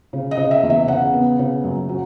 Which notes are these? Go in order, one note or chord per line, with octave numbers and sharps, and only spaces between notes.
C#3
D#5
C#3
E5
E2
E5
C#3 F#5
B3
C#3
F#2
F#3